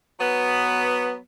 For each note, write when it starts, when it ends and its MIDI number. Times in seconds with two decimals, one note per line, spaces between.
0.20 1.16 54
0.20 1.16 59